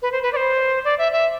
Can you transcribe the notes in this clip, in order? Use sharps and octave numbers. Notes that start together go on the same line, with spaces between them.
B4
C5
B4
D5
C5
D5
E5
E5